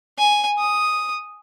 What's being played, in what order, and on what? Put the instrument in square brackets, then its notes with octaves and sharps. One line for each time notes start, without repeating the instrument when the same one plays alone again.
[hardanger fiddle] G#5
D#6